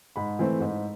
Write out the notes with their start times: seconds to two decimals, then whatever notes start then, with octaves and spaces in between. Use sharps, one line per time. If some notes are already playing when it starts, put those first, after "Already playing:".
0.16 G#2 B5
0.39 E3 A3 C4
0.60 G#2